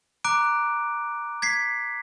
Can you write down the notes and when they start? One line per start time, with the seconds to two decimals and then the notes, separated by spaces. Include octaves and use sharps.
0.24 A#5 D6 F#6 D7
1.42 G#6 B6 C7